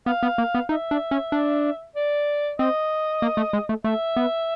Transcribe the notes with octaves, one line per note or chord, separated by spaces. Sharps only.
B3 F5
B3
A#3
B3
D#4 E5
D4
C#4
D4
D5
C4 D#5
A#3
A3
G#3
A3
A3 E5
B3